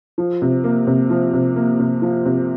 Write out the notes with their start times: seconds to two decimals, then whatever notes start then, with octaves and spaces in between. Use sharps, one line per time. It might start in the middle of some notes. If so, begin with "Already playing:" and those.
0.18 F3
0.42 C3
0.64 A#3
0.87 C3
1.10 F3
1.33 C3
1.56 A#3
1.79 C3
2.02 F3
2.26 C3